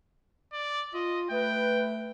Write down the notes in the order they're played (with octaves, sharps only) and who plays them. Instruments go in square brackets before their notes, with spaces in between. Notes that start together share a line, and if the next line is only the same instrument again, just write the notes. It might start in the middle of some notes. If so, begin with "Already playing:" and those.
[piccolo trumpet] D5
[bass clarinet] F4 [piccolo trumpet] D#5
[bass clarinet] A3 [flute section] B4 [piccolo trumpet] G5